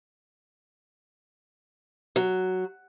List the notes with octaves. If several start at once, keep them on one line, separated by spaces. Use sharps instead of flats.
F#3